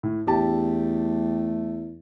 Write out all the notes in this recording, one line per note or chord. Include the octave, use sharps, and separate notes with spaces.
A2
E2 A3 D4 G4 A5